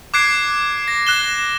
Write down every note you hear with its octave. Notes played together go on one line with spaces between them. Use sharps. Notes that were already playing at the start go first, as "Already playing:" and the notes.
D6 F#6 G#6 C7 D7
A#6
F#6 E7 G7